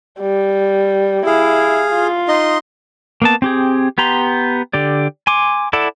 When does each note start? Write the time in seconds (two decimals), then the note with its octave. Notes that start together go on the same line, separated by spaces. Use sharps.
0.20 G3
1.26 E4 G#4 F5
1.92 F4
2.28 D#4 D#5 C6
3.22 A#3 B3 A5
3.42 C4 G4 G#4
3.98 B3 G4 A#5 C6
4.73 D3 G4 D5
5.27 G#5 C6 D6
5.73 E4 A4 D5 F#5